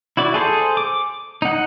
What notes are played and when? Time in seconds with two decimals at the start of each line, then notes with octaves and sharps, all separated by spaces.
0.17 E4 F#4 D5
0.34 G#4 A4 C5
0.77 D6
1.42 D#4 F#5